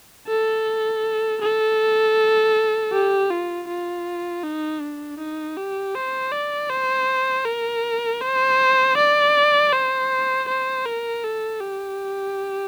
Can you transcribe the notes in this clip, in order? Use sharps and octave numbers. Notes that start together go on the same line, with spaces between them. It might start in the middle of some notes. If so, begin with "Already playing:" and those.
A4
A4
G4
F4
F4
D#4
D4
D#4
G4
C5
D5
C5
A#4
C5
D5
C5
C5
A#4
A4
G4